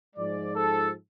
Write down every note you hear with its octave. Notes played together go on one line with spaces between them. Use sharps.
G#2 F3 G#3 D5
A4